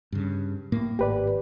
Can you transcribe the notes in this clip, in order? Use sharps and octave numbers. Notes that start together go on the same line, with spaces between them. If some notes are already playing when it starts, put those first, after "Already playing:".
G2 C#3
A2 A#3
G#1 G4 B4 D5